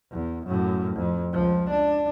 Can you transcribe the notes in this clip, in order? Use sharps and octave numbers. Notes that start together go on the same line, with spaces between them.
E2
F#2 A2
F2
C#2 F3
D4